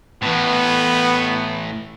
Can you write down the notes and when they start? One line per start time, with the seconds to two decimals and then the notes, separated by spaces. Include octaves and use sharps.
0.22 A2 E3 B3